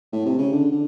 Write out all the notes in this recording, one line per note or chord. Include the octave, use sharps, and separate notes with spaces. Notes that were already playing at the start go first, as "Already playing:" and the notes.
A2
C3
C#3
D3
D3